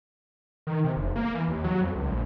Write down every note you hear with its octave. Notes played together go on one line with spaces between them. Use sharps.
D#3
C3
F1
A#3
E3
D#2
F#3
F2
C#2
A#1